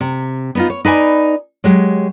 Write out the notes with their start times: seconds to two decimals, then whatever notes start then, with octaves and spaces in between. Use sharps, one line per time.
0.01 C3
0.55 B3 D#4 F4
0.70 C#5
0.85 D#4 B4 D5 G#5
1.64 F#3 G#3 G4